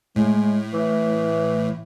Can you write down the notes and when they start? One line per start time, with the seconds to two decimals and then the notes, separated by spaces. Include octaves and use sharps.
0.16 A2 G#3
0.73 E3